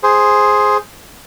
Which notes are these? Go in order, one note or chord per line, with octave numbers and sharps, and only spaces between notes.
G#4 C5